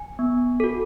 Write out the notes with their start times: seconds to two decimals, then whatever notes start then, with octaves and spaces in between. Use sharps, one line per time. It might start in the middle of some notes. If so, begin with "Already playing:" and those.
Already playing: G#5
0.19 B3
0.60 F#4 A4